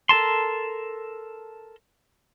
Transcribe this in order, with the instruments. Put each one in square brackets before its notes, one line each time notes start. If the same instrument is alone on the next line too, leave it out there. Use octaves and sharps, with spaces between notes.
[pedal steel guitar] A4 A#4 A5 C6